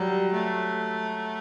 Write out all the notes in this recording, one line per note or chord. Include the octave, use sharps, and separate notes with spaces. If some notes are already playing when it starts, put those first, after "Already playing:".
Already playing: F#3 G3
A3